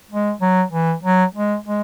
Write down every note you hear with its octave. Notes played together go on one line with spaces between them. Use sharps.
G#3
F#3
E3
F#3
G#3
G#3